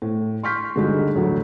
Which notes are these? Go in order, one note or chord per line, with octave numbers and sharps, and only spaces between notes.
A2
C6 C#6 F6 G6 B6
G2 D3 G#3 D#4 F#4
A1 D2 F#3 A3